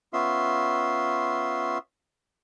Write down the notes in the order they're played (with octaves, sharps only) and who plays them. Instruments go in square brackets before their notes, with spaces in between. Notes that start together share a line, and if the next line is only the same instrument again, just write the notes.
[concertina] B3 C#4 F4 E5 C6